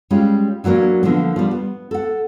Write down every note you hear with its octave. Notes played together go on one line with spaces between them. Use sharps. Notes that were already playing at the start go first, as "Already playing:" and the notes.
G3 G#3 C#4 F4
E3 F#3 G3 A#3 D4
D3 F3 A#3 B3
F3 G3
B3
A4 F#5